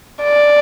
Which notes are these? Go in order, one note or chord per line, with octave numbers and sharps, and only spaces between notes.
D5